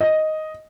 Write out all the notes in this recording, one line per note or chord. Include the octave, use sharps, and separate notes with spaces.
D#5